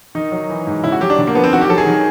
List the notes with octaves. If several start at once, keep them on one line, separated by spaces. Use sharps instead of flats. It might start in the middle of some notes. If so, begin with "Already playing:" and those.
D#3 D#4
F#3
E3
G#2
C#3 E4
F#4
F#3 G4
D4
D3
A#3
F3 B3
C4
D#3 F#4
G4
F#3 A4
G#4
D#3